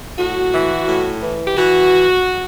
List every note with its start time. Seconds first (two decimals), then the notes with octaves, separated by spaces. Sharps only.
0.18 A2 F#4
0.52 E3
0.88 A2
1.22 E3
1.46 G4
1.57 E3 F#4